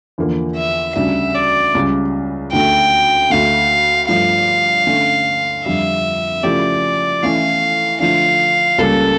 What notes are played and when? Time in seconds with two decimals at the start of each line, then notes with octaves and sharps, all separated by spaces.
0.18 E2 D3 F3 A#3
0.56 E5
0.96 D2 C#3 G3 D4 E5
1.35 D5
1.75 C#2 C#3 G3
2.52 D2 D3 A3 G5
3.30 D2 D3 A3 F5
4.09 G2 F3 A3 F5
4.87 D3 A3 C#4
5.66 F2 D3 G3 E5
6.43 C#3 F3 A3 E4 G4 D5
7.23 E3 A3 C#4 E4 A4 F5
8.00 D3 F3 A3 D4 F5
8.78 C#2 C#3 G3 A#3 A4